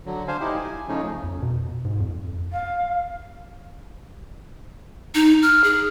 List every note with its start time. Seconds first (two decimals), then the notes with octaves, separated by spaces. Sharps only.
0.06 D3 F#3
0.28 D4 C5 F5 G#5
0.40 D#4 E4 G4
0.56 G#5
0.88 C#3 F3 A3 C#4 D#4
1.24 F2
1.42 B2
1.85 G#2
2.00 F2
2.52 F5
5.15 D#4
5.42 F6
5.64 G#4